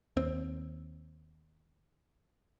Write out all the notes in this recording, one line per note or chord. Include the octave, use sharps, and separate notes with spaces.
D#2 C4